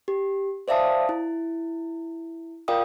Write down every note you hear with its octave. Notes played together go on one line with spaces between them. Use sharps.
G4
C5 D5 E5 F5 A5 D#6
E4
F4 A#4 D5 F5 G5 D#6